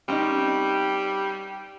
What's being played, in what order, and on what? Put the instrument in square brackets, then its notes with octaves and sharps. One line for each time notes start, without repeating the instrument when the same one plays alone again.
[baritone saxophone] G3 [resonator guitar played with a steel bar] C4 C#4 D#4